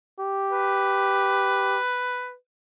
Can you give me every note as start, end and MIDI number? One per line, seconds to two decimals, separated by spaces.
0.20 1.79 67
0.52 2.34 71